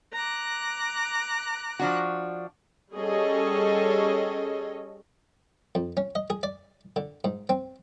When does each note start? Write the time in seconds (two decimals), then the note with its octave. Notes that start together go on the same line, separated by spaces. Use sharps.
0.13 A#5 D6 F#6
1.79 F3 D4 F#4
2.94 G3 C#4 G#4 A4 C#5 D#5
5.75 F2
5.97 C#4
6.15 D#5
6.30 G#4
6.43 D5
6.96 D3
7.24 G#2
7.49 C4